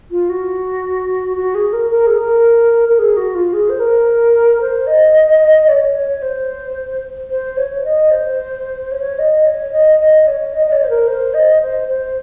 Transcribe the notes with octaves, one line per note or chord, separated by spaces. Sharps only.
F4
F#4
F#4
G#4
A#4
A#4
G#4
A#4
A#4
G#4
F#4
F4
G#4
C5
A#4
C5
D#5
C#5
C#5
C5
C5
C#5
D#5
C5
C#5
D#5
C#5
D#5
D#5
C#5
D#5
D#5
C#5
C5
A#4
C5
D#5
C5
C5